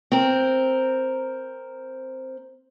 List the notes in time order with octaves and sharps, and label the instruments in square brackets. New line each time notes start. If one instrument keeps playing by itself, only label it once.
[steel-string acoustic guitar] C4 A#4